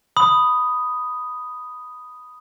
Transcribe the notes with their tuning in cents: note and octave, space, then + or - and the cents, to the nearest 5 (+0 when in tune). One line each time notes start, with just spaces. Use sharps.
B5 +5 D#6 +0